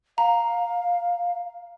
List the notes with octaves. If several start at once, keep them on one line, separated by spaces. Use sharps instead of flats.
F5 A#5